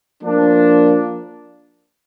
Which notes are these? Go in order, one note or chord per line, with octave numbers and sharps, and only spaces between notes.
F3 A#3 D4